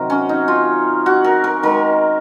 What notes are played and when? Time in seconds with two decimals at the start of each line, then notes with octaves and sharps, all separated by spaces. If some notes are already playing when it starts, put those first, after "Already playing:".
Already playing: C3 D#3 F#3 F#4 A#4
0.10 C#4
0.29 D#4
0.48 F4
1.06 F#4
1.24 A#4
1.44 A#4
1.63 D#3 G#3 A#4